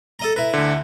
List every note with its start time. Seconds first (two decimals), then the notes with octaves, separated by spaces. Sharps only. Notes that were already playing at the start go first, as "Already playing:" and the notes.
0.19 A4 D#5 A#5
0.36 E4 B4 A#5
0.53 D2 D3